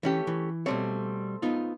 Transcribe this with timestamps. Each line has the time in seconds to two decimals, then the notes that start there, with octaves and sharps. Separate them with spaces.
0.03 E3 A3 C#4 G4
0.27 E3
0.66 B2 G3 A3 C4 C#5
1.42 B3 D#4 F4